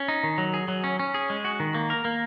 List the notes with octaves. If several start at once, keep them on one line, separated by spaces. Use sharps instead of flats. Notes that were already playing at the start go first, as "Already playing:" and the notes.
Already playing: C#4
D#4
D#3
F#3
G#4
F#3
C#4
C#4
G#4
G#3
F#4
D#3
A#3
A#4
A#3